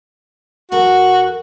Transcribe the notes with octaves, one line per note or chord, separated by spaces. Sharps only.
E2 F#4 A4 A#4